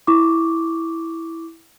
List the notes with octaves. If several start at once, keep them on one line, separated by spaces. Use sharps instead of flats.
E4 C#6 D6